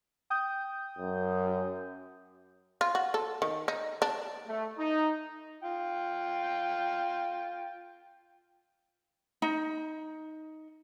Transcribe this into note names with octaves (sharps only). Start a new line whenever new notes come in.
G5 D#6 G6
F#2
F4
F#4
A4
D#3
D#4
D4
A3
D#4
F4 G5
D#4